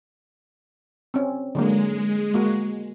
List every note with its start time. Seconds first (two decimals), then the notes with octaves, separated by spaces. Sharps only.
1.14 C4 C#4
1.55 D3 F#3 G#3 A#3
2.34 A#3 F#4